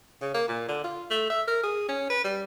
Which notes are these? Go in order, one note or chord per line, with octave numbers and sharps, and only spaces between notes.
C#3
A#3
A#2
D3
F4
A3
E5
A#4
G#4
C#4
B4
G3